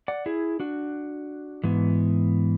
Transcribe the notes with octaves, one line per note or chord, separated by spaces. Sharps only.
D5 F#5
E4 G#4
D4 F#4
G#2 E3 B3